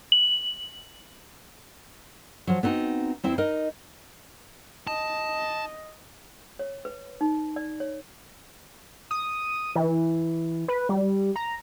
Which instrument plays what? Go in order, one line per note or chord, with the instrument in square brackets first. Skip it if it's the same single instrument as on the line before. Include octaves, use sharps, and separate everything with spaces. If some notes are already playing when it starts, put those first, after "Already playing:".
[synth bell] F#7
[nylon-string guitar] F3 F#3
B3 C4 D#4 F#4
E2 C4 E4
D#4 A#4 D#5
[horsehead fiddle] D#5 [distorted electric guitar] A5
[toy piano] C#5
B4
D#4
D5
C#5
[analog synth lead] D#6
E3
B4
G3
A#5